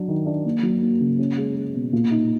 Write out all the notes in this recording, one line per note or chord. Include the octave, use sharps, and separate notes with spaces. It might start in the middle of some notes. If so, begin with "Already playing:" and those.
Already playing: F#3 D4
D#3
D4
A#3
F#3
A#3
C#3
C#4
G#3
G#3
B2
A#2
D#4